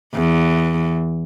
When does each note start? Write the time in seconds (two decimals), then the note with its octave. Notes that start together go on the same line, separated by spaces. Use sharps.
0.15 E2